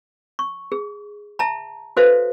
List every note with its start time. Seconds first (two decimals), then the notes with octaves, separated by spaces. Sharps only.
0.39 C#6
0.72 G#4
1.39 E5 A5 A#5
1.97 F#4 A4 B4 C5 E5 F5